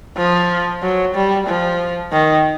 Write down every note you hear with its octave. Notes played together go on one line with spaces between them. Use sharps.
F3
F#3
G3
F3
D#3